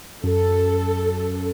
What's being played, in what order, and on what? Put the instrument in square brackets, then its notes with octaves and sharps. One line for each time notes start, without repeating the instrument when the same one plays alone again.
[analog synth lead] F#2 [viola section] A4